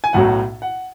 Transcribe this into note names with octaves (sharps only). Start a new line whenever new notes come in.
G#5
B1 A2 F#3 F#5
F#5